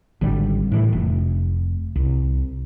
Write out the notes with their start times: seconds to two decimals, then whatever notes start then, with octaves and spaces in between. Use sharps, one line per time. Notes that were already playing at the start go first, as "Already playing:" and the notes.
0.21 G#1 D3 G3
0.72 A2 E3
0.93 F1
1.96 C2